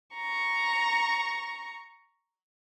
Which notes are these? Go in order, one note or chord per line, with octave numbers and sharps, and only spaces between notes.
A#5 C#6